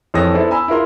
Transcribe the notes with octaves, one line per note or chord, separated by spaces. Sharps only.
F2 E3 A4 C#5 D#6 A#6
B3 E4 A4 C5 D5
G#5 A#5 B5 E6
E4 F4 A#4 C6